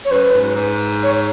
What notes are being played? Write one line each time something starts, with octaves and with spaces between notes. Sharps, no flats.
C#5
F#2 B4
G#2
G#2
C#5